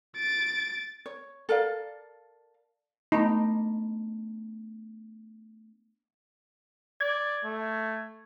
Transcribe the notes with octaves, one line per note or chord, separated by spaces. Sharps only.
A6 D7
C#5
A4 A#4 D5 F5
A3 B3 D4 D#4
D5 G#6
A3